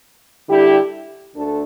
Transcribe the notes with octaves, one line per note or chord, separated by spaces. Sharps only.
D3 G3 E4 G4
D2 D3 A3 D4 A4